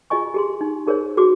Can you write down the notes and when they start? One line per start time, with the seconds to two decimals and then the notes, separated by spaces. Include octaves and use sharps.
0.10 F4 G#4 D#5 G#5 C#6
0.34 G4 G#4 C6
0.61 D#4
0.87 D#4 G#4 A#4 C5 C#5
1.17 F#4 G#4 D6